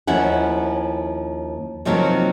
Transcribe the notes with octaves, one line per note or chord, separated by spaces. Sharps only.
D#2 F3 C#4 E4 F#5
C3 D#3 F3 F#3 A#3 C4